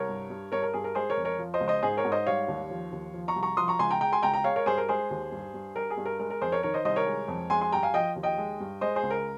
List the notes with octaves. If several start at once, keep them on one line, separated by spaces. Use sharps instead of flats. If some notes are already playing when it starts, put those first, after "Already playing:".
Already playing: C2 A#4 C#5
G2
G2
G2 A#4 C#5
A#4
G2 G#4
A#4
G#3 G#4 C5
A#4 C#5
F2
A#4 C#5
F3
C5 D#5
C#2
C5 D#5
G#2 G#4 C5
A#4 C#5
G#2
C5 D#5
G3 C#5 F5
D#2
F3
D#2
F3
A#5 C#6
C2
A#5 C#6
F3 C6 D#6
A#5 C#6
C#2 G#5 C6
G5 A#5
G#3 G5 A#5
G#5 C6
C#2 G5 A#5
G5 A#5
G#3 C#5 F5
A#4 C#5
G2 G#4 C5
A#4
G#3 G#4 C5
D#2
G2
G2
G3 A#4
G#4
G2
A#4
G#3 A#4
A#4
F2 G#4 C5
A#4 C#5
D#3 A#4 C#5
C5 D#5
C2 C5 D#5
A#4 C#5
G#3
F2
G#3 G#5 C6
G#5 C6
G2 G5 A#5
F5 G#5
F3 D#5 G5
D#2
D#5 G5
G#3
G2
G#3 C5 D#5
G#4 C5
C#2
A#4